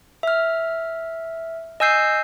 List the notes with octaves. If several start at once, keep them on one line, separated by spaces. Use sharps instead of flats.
E5 F6
D#5 G#5 E6 G6 C7